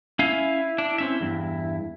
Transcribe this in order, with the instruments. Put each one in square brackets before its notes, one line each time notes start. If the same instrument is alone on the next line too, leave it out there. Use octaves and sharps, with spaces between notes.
[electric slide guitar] C#4 F5 G#5 [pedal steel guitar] E4
[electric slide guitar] D4
C4 C#4 E5
E2 G2